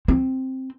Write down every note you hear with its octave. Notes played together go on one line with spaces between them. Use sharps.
C4